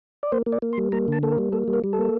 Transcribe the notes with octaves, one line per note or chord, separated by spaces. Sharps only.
D5
A#3 C5
A#3
D5
A#3
C6
G3
A#3 A#5
D3 A5
A#3 A4
A#4
G3
A#3 A4
G3
A#4
G3
A4
A#3